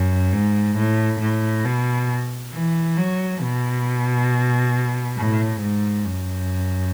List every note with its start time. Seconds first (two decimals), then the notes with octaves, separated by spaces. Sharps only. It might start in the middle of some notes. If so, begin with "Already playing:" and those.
Already playing: F#2
0.33 G#2
0.77 A2
1.21 A2
1.65 B2
2.53 E3
2.97 F#3
3.41 B2
5.17 A2
5.61 G#2
6.05 F#2